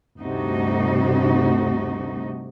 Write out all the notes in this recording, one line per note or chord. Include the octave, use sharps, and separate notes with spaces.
D2 G2 C3 A3 D#4 F#4